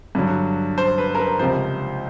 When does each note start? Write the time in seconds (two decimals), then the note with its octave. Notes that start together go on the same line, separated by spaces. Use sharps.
0.15 G2 D3 F#3
0.78 C5
0.98 B4
1.15 A#4
1.19 B4
1.39 C#2 C3 F3 C5